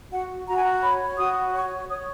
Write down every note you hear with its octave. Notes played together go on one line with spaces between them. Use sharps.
F#4 F#5
F#4 A#5
G#5
A#5
C#5 B5
F#4 D#6
C#5 C#6
C#5 D#6